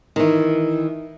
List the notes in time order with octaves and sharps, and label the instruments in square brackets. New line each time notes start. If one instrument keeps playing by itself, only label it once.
[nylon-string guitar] D#3 E3